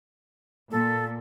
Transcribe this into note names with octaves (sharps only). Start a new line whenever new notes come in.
A#2 A4